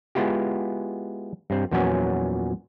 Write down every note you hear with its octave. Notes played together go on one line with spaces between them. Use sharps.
G#3 B3 E4 F4 G4
G2 C4
E2 A#2 F3 F#3 B3 C#4